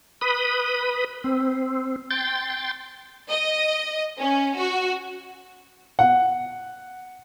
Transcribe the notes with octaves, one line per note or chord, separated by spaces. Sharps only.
B4 B5 D#6
C4
G5 C6 G6 A6
D#5
C#4
F#4
F#5